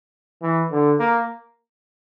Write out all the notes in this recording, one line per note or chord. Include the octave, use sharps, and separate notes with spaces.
E3
D3
A#3